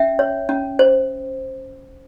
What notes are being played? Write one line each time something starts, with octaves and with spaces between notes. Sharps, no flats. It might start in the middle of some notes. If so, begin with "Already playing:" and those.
Already playing: C#4 E5 G5
C#5
C#4
C5